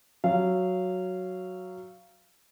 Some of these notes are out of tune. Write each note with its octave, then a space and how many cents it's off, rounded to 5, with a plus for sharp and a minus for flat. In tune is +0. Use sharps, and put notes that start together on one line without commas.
F#3 +0 F5 -20